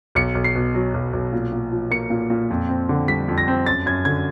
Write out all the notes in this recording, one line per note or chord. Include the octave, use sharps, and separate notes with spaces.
B1 C#7
B1
C7
B2
F#3
B1
B1
A#2
A#2
F3
A#3 C#7
A#2
A#2
F2
C4
D3
G3 B6
F2
A#6
C4
F#2 A6
F#2 G#6
D3 G#6